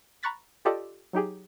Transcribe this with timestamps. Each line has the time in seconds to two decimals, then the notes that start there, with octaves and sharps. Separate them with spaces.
0.23 A#5 B5 C#6 F#6 A6 B6
0.65 F4 G4 A4 D5 D#5
1.13 F#3 D#4 G4 G#4